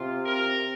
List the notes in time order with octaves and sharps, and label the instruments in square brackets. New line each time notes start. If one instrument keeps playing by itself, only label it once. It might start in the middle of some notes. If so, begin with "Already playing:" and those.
Already playing: [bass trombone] C3 [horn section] F4
[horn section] A#4